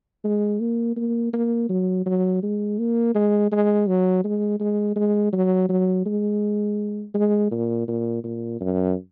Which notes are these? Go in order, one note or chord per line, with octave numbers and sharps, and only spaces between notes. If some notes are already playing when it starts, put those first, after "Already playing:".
G#3
A#3
A#3
A#3
F#3
F#3
G#3
A#3
G#3
G#3
F#3
G#3
G#3
G#3
F#3
F#3
G#3
G#3
A#2
A#2
A#2
F#2